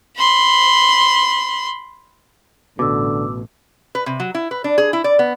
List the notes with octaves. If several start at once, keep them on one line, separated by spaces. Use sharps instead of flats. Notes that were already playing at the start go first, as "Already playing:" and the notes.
B5 C6
A1 B2 D3 D6 E6
B4
C3
F#3
E4
B4
D4
G#4
E4
D5
B3